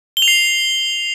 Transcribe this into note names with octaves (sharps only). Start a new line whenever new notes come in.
G7
F7
C7